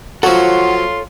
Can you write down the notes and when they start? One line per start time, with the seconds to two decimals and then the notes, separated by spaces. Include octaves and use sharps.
0.23 F3 F#3 F4 A4 C5 C#5 F#5 C6